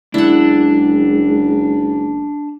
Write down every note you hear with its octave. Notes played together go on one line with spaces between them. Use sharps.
F#1 G#3 D4 E4 F#5